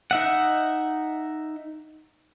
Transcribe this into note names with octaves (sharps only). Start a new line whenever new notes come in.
D#4 E5 F#5